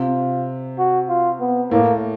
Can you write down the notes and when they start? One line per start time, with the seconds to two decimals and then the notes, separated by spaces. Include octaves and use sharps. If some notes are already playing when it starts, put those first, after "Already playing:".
Already playing: C3 F4
0.78 F#4
1.08 F4
1.40 B3
1.71 A2 A#3